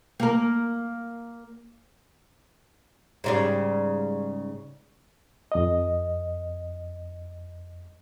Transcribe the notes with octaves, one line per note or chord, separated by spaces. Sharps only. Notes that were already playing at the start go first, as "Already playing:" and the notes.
A#3 A#4
G#2 C#3 G3
F2 D#5